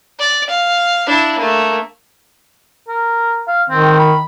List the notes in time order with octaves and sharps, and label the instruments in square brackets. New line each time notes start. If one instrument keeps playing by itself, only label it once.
[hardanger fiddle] D5
F5
D4 E4
A3 A#3
[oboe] A#4
F5
[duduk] D#3 [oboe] C4
[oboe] B5